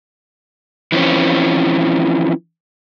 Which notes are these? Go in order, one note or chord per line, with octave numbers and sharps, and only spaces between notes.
E3 F3 C4 C#4